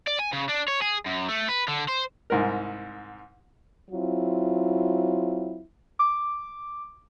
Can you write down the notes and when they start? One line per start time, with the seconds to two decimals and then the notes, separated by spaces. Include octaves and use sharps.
0.07 D5
0.19 G#5
0.33 C#3
0.49 D4
0.68 C#5
0.82 G#4
1.06 F#2
1.29 A3
1.49 B4
1.68 D3
1.88 C5
2.30 C2 G#2 A#4
3.91 F#3 C4 E4 F4
5.99 D6